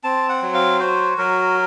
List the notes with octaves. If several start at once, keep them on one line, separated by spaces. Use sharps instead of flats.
C4 A5
F#5
F#3
F5
F#4 C5
F#3 A#4